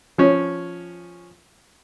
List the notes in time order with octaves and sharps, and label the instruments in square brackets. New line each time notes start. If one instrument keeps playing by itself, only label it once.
[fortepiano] F3 C#4